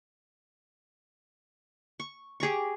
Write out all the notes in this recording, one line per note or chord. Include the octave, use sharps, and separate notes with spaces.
C#6
G4 G#4 A#5 C#6